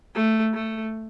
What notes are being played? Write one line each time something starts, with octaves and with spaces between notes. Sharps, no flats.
A3
A3